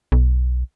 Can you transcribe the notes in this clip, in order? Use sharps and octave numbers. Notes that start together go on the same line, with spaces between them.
B1